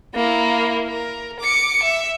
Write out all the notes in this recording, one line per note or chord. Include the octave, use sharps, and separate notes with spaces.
A#3 E4
A#4
D6 C#7
E5